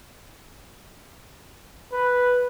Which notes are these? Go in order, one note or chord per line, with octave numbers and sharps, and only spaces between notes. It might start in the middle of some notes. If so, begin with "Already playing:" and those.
B4